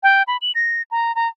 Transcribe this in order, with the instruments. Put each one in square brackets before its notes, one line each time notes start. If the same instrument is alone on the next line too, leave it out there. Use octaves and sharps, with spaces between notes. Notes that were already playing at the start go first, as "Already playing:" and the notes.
[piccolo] G5
B5
F#7
A#6
A#5
A#5